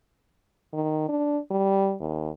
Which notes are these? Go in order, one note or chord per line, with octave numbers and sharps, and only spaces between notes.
D#3
D4
G3
D#2